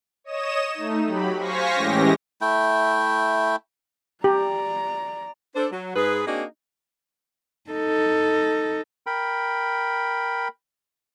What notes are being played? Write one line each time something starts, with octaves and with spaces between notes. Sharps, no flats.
C#5 D#5 D#6 E7
A3 D#4
F#3 G4 B5
C5 F5 G#5 C#6 A#6 B6
A2 E3 G#3 C#4 G4 A#6
A3 E4 G5
G4 D5 A#5
D4 A4 C5
F#3
G#2 G#4 B4
A#3 C4 D4 D#4 F#4 G#4
D#4 A4
A#4 G5 B5